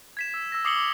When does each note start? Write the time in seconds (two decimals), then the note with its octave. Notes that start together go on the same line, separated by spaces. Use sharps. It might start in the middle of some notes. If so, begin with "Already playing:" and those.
0.17 G#6 B6 E7
0.34 E6
0.52 E6 A#6
0.65 D6 D#6 C7 C#7 F#7 G7
0.76 D6